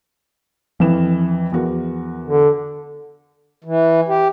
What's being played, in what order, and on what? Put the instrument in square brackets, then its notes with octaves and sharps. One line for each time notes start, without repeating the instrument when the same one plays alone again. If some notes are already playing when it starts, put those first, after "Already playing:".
[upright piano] F2 E3 E7 [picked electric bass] F3
[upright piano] E2 F#4 A#4
[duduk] D3
[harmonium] E3
G4